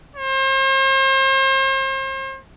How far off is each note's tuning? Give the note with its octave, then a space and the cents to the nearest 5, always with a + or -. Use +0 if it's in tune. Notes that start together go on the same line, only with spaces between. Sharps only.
C5 +40